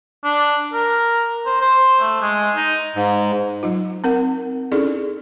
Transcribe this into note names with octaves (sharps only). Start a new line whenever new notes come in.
D4
A#4
C5
C5
A3
G#3
D#4
G#2
F#3 D#4 F4
C4 A#4 F#5
C#4 D#4 E4 G#4 A4 D5